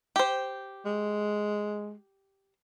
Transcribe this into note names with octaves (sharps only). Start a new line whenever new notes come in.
G4 C5
G#3